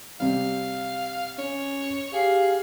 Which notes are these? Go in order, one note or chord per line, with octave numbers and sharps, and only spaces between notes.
C3 G3 F5
C#4 C#5
G4 G#4 F5